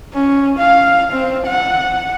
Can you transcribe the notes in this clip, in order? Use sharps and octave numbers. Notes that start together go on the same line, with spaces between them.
C#4
F5
C4
F#5